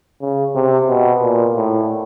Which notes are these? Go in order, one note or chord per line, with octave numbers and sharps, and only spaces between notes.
C#3
C3
B2
A#2
A2